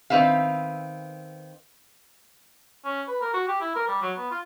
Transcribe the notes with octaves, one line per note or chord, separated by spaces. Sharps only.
D#3 C4 B4 E5 F5
C#4
B4
A#4
F#4
G4
E4
A#4
G3
F#3
B3
F4